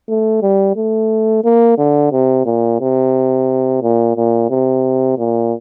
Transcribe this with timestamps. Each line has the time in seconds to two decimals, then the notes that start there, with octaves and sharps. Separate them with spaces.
0.08 A3
0.42 G3
0.76 A3
1.44 A#3
1.78 D3
2.12 C3
2.46 A#2
2.80 C3
3.82 A#2
4.17 A#2
4.50 C3
5.18 A#2